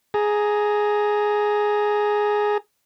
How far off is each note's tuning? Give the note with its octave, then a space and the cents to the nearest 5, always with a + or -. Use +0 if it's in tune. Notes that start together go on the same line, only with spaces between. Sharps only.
G#4 +5 A#5 +0